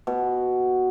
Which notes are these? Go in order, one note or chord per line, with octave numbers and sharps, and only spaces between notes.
B2